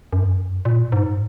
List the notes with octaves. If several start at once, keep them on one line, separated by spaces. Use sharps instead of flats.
F#2
A#2
G#2